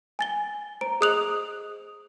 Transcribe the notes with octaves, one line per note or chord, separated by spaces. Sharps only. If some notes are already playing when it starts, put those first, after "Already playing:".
G#5 A6 G7
C5 A#5 D7
G#4 D#5 D#6 F#6 F7 F#7